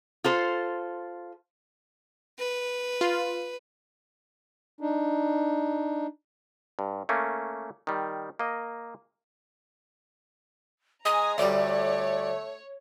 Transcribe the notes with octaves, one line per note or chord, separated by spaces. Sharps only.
F4 A4 C5
B4
F4
D4 D#4
G2
A3 A#3 C#4
D#3 G3
A#3 D#5
G#3 G#5 A#5 D#6
D2 G3 A3 C#5 D5